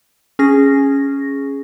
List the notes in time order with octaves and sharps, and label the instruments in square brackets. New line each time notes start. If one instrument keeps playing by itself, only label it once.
[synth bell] C#4 G#4 A#6